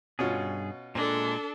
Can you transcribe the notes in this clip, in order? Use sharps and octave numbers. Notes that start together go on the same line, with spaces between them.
G2 B2 C#4 F4 G#4
A#2 G#3 D4 A4